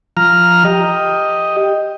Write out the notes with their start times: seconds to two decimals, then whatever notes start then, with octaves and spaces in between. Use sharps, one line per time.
0.17 F3 A#5 F6
0.65 G4 D#5